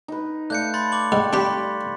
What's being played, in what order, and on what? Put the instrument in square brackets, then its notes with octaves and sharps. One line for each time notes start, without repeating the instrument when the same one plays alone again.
[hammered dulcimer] D#4 B4
[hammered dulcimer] A3 D5 F5 [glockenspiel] F#6 G6 C#7
[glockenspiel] B5 C6 A6
C#6 D6 F#7
[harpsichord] G#2 [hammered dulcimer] G3
[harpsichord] D4 G4 [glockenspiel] C6 B6